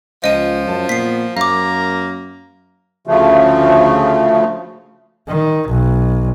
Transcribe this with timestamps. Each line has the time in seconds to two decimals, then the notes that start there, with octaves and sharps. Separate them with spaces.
0.24 C#2 F3 D#5 D#7
0.68 F#2 A5
0.89 A#2 B3 B6 C7
1.37 F#2 A#3 F5 A#5 D6
3.07 D2 C#3 F3 A3
5.28 D#3
5.68 B1